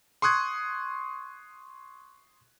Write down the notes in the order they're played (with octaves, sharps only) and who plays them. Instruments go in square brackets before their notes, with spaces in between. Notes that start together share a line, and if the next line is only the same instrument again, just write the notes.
[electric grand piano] C6 C#6 D#6 F#6 G#6